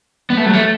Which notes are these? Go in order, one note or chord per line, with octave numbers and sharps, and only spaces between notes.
B3
A3
F#3
A3